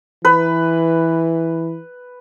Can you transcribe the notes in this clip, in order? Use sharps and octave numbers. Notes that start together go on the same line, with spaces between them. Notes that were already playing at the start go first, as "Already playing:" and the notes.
E3 B4